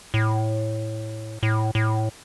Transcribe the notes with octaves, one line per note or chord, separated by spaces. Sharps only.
A2
A2
A2